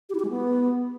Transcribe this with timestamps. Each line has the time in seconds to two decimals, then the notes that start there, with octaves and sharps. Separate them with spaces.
0.09 G4
0.14 E4
0.20 G4
0.25 G#3
0.30 B3